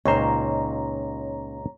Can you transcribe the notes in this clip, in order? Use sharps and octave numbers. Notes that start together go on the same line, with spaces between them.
C#2 A#2 C#4 D#4 C5 C#5 A#5